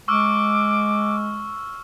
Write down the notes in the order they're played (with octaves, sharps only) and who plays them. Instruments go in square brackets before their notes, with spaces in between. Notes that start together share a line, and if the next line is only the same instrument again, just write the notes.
[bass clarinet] G#3 [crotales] C#6 E6 F6 [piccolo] D6